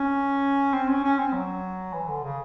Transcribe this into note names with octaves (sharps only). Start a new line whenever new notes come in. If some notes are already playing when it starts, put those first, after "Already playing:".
Already playing: C#4
C4
C#4
C#4
C4
F#3
E3
D3
C#3